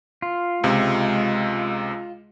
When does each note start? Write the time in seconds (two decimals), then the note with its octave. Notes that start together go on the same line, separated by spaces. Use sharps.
0.22 F4
0.64 C#2 C3 G#3